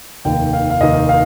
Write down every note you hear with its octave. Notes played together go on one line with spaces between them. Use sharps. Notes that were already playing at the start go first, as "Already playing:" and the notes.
F1 D#2 D#3 G5
F5
F5
F1 D#2 D#3 D#5
F5